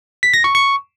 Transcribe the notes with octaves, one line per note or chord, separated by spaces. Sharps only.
B6
A#6
C#6
C#6